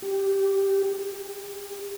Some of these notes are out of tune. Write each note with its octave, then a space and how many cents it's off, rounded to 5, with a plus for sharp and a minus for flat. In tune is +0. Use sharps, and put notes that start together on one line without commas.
G4 -5
G4 +40